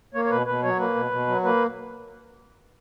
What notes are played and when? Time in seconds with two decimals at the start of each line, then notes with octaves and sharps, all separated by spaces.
0.14 A#3 C#5
0.25 C#5
0.30 B2 B4
0.46 B2 B4
0.63 F#3 C#5
0.79 A#3 B4
0.95 B2
1.11 B2
1.27 F#3
1.44 A#3 B4